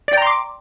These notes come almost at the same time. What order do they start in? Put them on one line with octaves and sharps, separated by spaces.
D5 G5 A#5 C6 D6